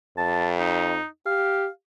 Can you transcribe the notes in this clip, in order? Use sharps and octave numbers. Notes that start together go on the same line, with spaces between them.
F2 A5
D#4
G4 F5